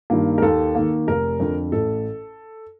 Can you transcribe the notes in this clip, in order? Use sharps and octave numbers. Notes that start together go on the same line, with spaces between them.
G2 D#3 A#3
A#4
D#2 A4
D#3 A#3
F1 A#4
F2 D3
A1 A4